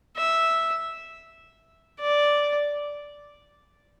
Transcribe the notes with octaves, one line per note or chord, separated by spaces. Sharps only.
E5
D5